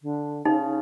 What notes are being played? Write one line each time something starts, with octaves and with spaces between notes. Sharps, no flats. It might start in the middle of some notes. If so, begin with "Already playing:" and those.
D3
C#3 D#4